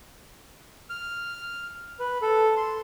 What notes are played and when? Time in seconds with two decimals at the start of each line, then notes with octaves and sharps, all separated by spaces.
0.90 F6
2.00 B4
2.22 A4
2.57 C6